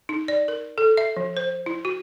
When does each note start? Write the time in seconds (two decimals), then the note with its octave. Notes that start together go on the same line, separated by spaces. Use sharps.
0.09 D#4
0.28 D5
0.48 A#4
0.78 A4
0.97 E5
1.17 F3
1.37 C5
1.66 E4
1.85 F#4